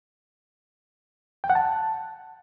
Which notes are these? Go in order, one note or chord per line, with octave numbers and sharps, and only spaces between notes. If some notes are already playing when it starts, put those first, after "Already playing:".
G5
F#5
A5